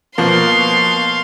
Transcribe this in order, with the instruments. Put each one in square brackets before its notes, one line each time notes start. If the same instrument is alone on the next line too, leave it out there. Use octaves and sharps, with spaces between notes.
[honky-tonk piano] B2 F3 A#3 [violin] F5 C6